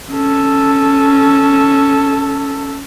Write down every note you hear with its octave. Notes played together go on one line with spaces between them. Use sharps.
C#4 A4